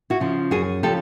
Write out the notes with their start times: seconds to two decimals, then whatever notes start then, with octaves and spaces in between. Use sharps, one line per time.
0.10 E4 F#4
0.20 C#3 F3
0.51 F#2 F#4 G#4
0.83 C#3 F3 G4 A4